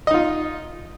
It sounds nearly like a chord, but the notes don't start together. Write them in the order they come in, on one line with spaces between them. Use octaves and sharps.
D#5 D#4 F4